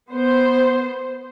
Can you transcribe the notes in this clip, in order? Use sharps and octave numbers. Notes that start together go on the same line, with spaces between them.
B3 C5